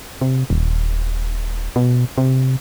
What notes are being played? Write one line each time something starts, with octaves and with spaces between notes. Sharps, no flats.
C3
D#1
B2
C3